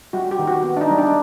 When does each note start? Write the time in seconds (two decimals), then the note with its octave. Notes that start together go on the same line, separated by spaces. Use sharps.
0.13 G3 F#4
0.31 G4
0.39 D#3
0.47 F#4
0.64 B3
0.77 D4
0.81 D#4
0.90 G3
0.98 D4